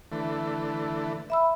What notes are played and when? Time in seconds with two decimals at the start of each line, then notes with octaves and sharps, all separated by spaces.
0.12 D3 E3 A3
1.30 E5 B5 E6